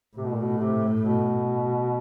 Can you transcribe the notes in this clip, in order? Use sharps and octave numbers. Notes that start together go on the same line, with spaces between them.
A2 C3
B2
A#2
B2
C3
B2